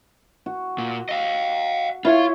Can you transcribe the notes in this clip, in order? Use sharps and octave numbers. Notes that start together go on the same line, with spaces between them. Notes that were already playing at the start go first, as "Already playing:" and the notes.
F#4
A#2
D#5 F5
E4 F4 C#5 F5